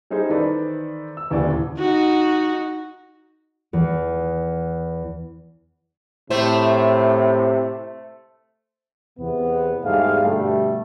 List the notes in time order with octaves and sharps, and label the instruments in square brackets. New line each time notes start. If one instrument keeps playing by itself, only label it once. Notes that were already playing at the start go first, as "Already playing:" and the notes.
[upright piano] G3 C#4 D#4 E4 G#4 C5
D#3 E3 A4 B4 C5 D5
E6
D#1 D2 C#3 E3 E4 D5
[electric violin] D#4 F#4
[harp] E2
[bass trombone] A2 [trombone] C3 [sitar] A3 C5
[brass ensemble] E2 C3 B3
E2 G#2 G3 A3 G#4 F5
G2 B2 D3 G3 A3